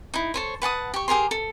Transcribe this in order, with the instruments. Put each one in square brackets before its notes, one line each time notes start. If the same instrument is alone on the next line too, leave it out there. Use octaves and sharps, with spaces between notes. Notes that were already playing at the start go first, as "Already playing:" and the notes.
[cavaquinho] D#4 E4
A4 C5 C#5
B4 F#5 A5 D#6
G4 C#6
G4 G#4 A#4 C6
A4